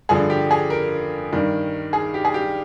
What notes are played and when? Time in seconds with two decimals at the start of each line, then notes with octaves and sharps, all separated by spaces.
0.09 G2 D3 F3 G#4
0.30 G4
0.51 G#4
0.70 A#4
1.33 G2 D#3
1.93 G#4
2.14 G4
2.25 G#4
2.34 G4